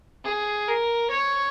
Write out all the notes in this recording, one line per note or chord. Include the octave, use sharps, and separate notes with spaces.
G#4
A#4
C#5